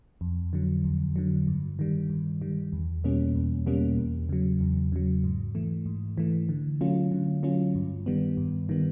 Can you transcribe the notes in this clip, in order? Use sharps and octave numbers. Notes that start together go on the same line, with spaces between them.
F2
D3 F#3
F2
D3 F#3
G2
D#3 G3
G2
D#3 G3
E2
B2 G3 A#3 C#4
E2
B2 G3 A#3 C#4
E2
C#3 F#3
E2
C#3 F#3
G#2
E3 A3
G#2
E3 A3
D3
F#3 A3 C#4 F4
D3
F#3 A3 C#4 F4
G2
D#3 G3 B3
G2
D#3 G3 B3